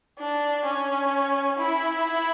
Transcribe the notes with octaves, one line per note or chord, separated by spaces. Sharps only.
D4
C#4
E4